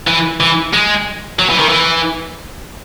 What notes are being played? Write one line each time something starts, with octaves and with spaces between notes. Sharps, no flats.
E3
E3
G#3
F#3
E3
D#3
E3